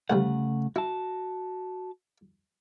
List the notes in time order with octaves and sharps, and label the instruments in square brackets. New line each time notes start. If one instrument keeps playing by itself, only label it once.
[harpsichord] D2 F3 G3 [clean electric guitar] C#3 A3 F#5
[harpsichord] E4 [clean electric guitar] F#4 A5